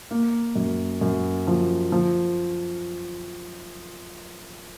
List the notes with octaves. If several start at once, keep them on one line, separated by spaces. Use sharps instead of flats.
A#3
F#2
F#2
F3
F3